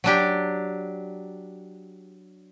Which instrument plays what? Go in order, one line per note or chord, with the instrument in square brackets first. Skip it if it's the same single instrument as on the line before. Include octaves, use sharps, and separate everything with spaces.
[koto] F#3 D4 G4